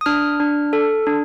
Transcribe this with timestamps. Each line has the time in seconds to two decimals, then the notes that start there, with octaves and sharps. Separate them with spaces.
0.01 D#6
0.06 D4 F6
0.40 D4
0.73 A4
1.07 D4